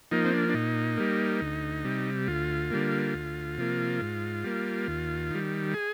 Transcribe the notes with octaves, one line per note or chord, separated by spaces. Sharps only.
F3 A#3 D#4
C4
D4
D4
A#2 D#4
G3 A#3
D2
C3 G3
D2 F4
D3 G3 A#3
D2
C3 F3 A#3
G#2
G3 A#3
D#2
D#3 G3
G#4